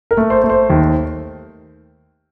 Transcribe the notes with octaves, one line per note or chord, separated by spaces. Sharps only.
A#4
A3
C5
A3
C5
D#2